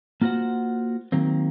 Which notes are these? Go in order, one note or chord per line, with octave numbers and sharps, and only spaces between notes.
A#3 F4 F#4 C5 F#5
D#3 F#3 A#3 C4